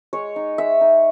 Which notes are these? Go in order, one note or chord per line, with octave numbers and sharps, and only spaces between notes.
G#3 C#5
D#4
G#3 E5
D#4